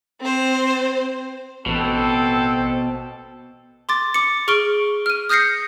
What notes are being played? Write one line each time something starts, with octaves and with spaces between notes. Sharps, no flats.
C4 C5
A1 B2 C4 A4
C6 D6 A6
D6 C#7
G#4 C#6 F6 D7 G7
F6 D#7
D#6 F6 G6 A#6 C7 C#7